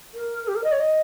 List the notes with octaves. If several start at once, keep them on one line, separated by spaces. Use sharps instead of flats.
A#4
G4
A#4
D#5
C#5
D#5